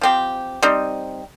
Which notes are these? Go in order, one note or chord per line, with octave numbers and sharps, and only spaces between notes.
F3 C4 G4
G3 C4 D#4